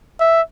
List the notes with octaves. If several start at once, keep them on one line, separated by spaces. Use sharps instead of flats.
E5